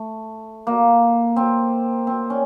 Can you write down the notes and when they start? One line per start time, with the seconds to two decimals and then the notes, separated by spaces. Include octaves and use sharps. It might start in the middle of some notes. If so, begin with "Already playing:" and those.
Already playing: A3
0.67 A#3
1.36 C4
2.07 C4
2.30 C#4